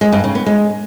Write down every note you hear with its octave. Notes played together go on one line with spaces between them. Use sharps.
G#3
G2
C#3
B3
G#3